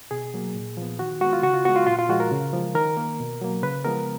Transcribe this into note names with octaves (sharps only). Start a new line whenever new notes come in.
B2 G#4
F#3 A#3
A#2
F3 B3
D#3 F#4
G#3 B3 F#4
F4
C#3 F#4
F4
G#3 B3 F#4
F4
A#2 F4
F4
F3 G#3 F#4
A#4
C#3
F3 G#3
D#3 A#4
A#3
B2
F#3 A#3
C#3 B4
F3 G#3 B3 A#4